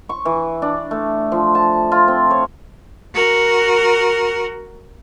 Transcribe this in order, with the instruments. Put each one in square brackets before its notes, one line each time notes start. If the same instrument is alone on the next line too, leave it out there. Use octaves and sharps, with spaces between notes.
[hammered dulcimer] C#6
E3
D4
A3
F3
A5
F4
C4
C#5
[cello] F#4 A#4